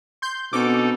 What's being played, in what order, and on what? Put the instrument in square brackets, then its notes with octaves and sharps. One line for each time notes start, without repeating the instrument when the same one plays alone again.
[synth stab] C6 G6
[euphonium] B2 [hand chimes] C4 D4 [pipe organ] D#4 A4 [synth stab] D6